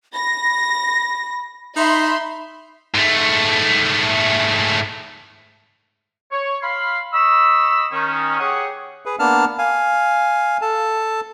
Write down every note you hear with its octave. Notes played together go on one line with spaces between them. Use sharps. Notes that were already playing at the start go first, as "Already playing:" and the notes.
B5 A#6
D#4 E5 B5 C6
G#2 A3
C#5
F5 B5 C6
D#5 B5 C#6 E6
D#3 C#4
G4 G#4 C#5 F#5 C#6 D#6
G#4 B4
A#3 B3 D4 A5 F6
F5 G#5
A4 A5